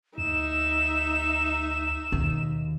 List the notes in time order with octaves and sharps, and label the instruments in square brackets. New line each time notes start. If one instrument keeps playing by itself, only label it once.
[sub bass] D2 [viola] D#4 E5 [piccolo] E7
[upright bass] D#2 [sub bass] B2